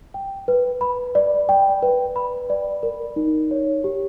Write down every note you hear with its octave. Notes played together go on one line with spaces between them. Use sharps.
G5
B4
B5
D5
G5
B4
B5
D5
A#4
D#4
C#5
G4